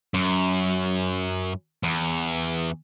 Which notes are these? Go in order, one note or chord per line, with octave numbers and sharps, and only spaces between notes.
F#2
E2